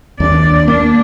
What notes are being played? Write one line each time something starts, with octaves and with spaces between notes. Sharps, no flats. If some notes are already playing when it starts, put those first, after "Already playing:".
D#2 D4 D5
A#3 D4